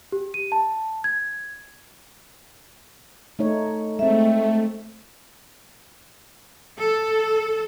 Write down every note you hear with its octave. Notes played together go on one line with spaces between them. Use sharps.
G4
D#7
A5
G#6
A3 D#4 C#5
G#3 A3 C4 E5
A4